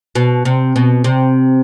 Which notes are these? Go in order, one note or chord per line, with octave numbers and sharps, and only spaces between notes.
B2
C3
B2
C3